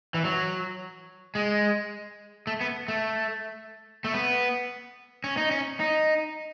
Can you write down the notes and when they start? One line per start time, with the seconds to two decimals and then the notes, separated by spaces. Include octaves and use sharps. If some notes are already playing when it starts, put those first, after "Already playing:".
0.14 E3
0.25 F#3
1.35 G#3
2.47 A3
2.61 B3
2.88 A3
4.04 A3
4.14 B3
5.24 C#4
5.37 D#4
5.51 C#4
5.80 D#4